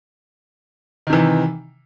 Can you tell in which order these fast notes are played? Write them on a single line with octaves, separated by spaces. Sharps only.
D#3 C3 E3